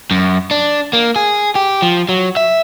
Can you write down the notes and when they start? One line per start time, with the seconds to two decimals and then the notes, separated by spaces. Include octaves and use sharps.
0.11 F#2
0.51 D4
0.93 A#3
1.16 G#4
1.55 G4
1.82 F3
2.09 F#3
2.37 E5